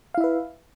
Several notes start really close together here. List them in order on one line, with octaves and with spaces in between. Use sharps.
F5 E4 E5 B4